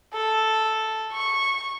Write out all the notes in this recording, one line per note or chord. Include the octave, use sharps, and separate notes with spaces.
A4
C#6